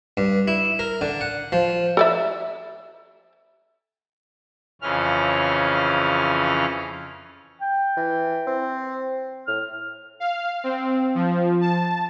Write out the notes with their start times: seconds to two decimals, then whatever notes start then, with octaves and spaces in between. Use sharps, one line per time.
0.17 G2
0.48 E4
0.79 A#4
1.01 D3
1.21 F#5
1.52 F3
1.97 A4 D5 E5
4.82 F2 C#3 E3 C#4 F6
7.61 G5
7.97 E3
8.47 C4
9.47 A2 F6
10.20 F5
10.64 C4
11.15 F3
11.61 A5